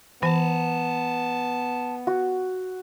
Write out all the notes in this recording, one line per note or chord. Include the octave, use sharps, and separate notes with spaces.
E3 B3 G#5 A5
F#4